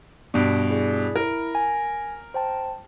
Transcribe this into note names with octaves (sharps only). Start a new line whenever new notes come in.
G2 B2 D5 D7
E4 G#4 D5
E4 A#4
G#5
C5 G5 A5